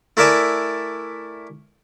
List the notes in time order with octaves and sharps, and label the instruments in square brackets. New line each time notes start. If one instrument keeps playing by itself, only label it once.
[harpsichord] A3 E4 A#4 D5 E5 G#5